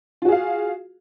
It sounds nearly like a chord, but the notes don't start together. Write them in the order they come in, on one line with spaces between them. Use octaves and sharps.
F4 F#4 G#4 F5